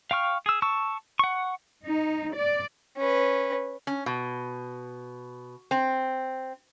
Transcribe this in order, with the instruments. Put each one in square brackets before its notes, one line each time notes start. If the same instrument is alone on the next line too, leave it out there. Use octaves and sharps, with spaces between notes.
[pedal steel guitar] F5 G5 C#6 F6
G#4 E6
A5 C#6 E6
F#5 C#6
[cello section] D#4
D5
[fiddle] C#4 B4
[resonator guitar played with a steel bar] C#4
B2
C4